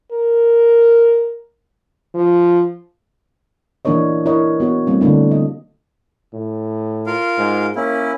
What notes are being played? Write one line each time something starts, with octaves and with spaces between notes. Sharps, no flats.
A#4
F3
E3 A#3 D4 A#4 C#5 D#5
E4 A#4 C#5 D#5
B3 F#4 C#5
G3 A3 A#3 C4
D3 A3 A#3 D4 E4
D#5
A2
F4 A#4 F5
G#2
A#3 C#4 E4